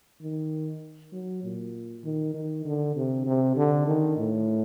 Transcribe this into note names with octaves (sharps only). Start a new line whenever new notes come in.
D#3
F#3
A#2
D#3
D#3
D3
C3
C3
D3
D#3
A2